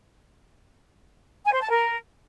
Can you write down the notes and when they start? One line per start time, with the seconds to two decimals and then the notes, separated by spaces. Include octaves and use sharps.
1.44 G#5
1.53 C5
1.61 A5
1.70 A#4